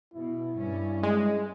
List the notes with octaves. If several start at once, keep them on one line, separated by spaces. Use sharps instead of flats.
B2 E4
G2 C#4
G#3